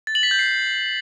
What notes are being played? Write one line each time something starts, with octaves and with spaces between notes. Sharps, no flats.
A6
F#7
B6
G6
C7